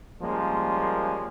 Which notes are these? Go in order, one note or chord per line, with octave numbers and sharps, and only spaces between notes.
F3 G3 G#3 A#3 C#4